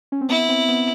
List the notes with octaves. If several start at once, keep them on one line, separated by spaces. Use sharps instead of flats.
C#4
C4
B3 E4
C4
B3